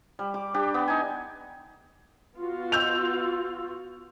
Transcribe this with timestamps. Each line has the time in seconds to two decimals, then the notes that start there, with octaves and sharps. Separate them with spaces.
0.19 G3
0.34 D6
0.54 D4 G4
0.74 B3
0.88 D#4 G#5
2.36 B3 F4 F#4
2.72 E6 G6 F7